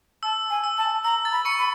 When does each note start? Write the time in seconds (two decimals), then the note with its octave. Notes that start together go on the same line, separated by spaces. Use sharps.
0.23 A5 E6
0.50 G#5
0.64 E6
0.77 A5
1.04 A#5 E6
1.25 A6
1.32 B5
1.45 C#6 C#7
1.59 B5